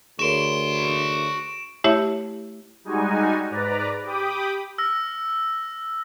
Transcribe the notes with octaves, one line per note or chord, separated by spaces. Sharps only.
D2 F#4 G#4 A#4 C#5 C6 D7 E7
A3 E4 G4 C#5 E5
G3 G#3 D#4 F#4 G#5
G#2 B4 D5 A#5
G4 G5 B5 D6 D#6
E6 F6 A#6